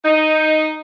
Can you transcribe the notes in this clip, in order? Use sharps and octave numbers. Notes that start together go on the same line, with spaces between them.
D#4